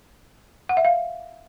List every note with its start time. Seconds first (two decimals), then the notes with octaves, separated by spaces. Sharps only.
0.69 F#5
0.77 E5
0.85 F5